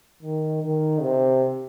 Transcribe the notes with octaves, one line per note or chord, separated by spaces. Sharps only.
D#3
D#3
C3